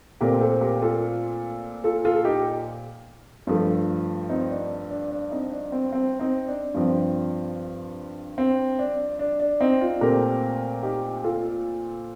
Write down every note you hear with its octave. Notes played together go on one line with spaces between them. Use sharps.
A#2 A3 C4 G4 A#4
A4 C5
G4 A#4
F4 A4
F4 A4
F4 A4
A4
D#4 G4
G2 F3 A3
C4 D#4
D4
D4
D4
C4 D#4
D4
C4
C4
C4 D#4
D4
G2 F3 C4
C4
D4
D4
D4
C4 D#4
D4 F4
A#2 A3 C4 G4 A#4
D#4 G4
F4 A4